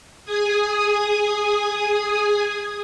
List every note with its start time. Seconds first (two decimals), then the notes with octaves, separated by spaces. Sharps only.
0.25 G#4 G#5 D#6